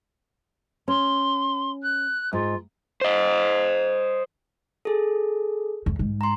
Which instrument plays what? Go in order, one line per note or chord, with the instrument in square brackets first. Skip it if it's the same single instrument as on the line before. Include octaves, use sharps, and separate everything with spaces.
[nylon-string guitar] C#4 [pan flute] C6
[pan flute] F#6
[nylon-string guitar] G#2 [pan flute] F4
[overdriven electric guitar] C5 D#5
[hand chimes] G#4 A4
[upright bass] E2
G#2
[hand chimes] A#5 C6